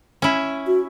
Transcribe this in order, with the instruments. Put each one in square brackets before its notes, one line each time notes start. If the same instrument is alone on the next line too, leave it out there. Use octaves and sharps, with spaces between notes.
[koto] C#4 E4
[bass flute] F#4